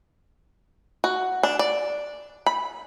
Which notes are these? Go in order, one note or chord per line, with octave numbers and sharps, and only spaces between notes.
F#4
D4
D5
B5